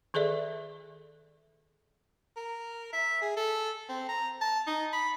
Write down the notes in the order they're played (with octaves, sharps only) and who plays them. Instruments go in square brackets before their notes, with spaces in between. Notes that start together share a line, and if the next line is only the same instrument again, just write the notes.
[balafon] D#3 G#4 A4 D5 E5
[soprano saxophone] A#4
E5
G#4
A4
C4
A#5
A5
D#4
B5